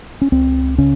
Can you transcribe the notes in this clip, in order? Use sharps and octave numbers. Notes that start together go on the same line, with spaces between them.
C#4
C#2 C4
C#3 C#4